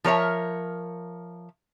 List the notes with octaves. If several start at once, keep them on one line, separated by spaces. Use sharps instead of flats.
F3 A#4 C#5 E5